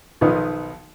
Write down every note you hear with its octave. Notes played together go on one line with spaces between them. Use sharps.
B1 D#3 F3 B3 D#4